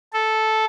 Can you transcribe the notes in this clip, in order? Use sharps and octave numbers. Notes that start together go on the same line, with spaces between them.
A4